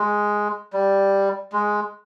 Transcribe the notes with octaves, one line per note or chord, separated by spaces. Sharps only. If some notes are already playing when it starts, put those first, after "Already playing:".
Already playing: G#3
G3
G#3